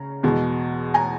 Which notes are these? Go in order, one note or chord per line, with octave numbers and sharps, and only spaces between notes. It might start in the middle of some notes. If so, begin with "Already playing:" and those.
Already playing: C#3 A#5
E2 B2 G#3
G#5 A#5